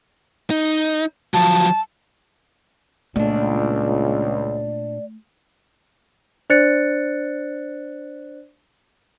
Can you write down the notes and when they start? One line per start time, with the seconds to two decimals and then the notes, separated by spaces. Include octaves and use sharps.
0.50 D#4
1.34 F3 F#3 A5
3.16 C#2 A#2 A3 D4 D5
6.50 D4 C5 D5 F#6 A6 C#7